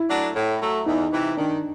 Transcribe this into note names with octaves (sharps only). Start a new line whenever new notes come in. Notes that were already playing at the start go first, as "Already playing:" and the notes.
Already playing: E4
F#3 A3 D4
A2
F#3 A3
E2 D#4
C3 E3
D#3 D4